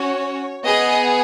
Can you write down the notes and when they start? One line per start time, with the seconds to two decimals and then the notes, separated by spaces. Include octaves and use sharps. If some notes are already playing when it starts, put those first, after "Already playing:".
Already playing: C#4 F#4 C#5
0.65 B3 G#4 D#5